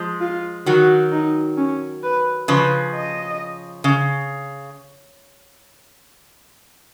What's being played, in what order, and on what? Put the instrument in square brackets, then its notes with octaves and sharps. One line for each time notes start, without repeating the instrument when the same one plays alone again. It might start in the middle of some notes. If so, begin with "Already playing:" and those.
Already playing: [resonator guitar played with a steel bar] F3 G#3
[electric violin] F4
[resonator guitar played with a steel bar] D#3 F#3 [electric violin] F#4
[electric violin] D#4
C#4
B4
[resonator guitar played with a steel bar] C#3 F3 [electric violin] B4
[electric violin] D#5
[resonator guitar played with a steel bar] C#3